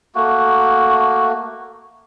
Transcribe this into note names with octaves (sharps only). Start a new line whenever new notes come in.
A3 A#3 F#4